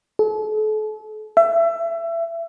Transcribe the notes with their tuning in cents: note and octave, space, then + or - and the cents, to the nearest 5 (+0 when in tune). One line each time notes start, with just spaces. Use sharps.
A4 -40
E5 +25